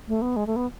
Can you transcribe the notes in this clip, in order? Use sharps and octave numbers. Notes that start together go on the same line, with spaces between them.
A3
B3
G#3
A3
B3